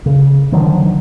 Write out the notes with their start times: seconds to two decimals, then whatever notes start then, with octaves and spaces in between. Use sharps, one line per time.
0.06 C#3
0.52 D3 D#3 F3 F#3